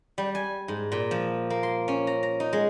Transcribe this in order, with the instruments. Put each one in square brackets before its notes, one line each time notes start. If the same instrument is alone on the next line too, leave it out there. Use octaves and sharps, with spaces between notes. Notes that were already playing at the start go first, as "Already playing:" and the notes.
[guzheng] G3
G#5
G#2
A#2
F3
A#3
C6
C#4
A#5
A#5
D#4
G#3